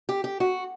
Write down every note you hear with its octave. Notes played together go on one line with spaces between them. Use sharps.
G4
G4
F#4